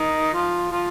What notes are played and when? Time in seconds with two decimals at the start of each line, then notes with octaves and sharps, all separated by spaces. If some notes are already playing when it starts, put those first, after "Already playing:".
Already playing: D#3 D#4
0.33 F3 F4
0.71 F3 F4